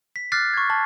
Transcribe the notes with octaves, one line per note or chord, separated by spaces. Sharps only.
B6
D6 F6 F#6 A6 C7
C#6 G#6
A5